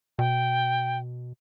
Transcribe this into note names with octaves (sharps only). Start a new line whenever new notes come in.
B2 G5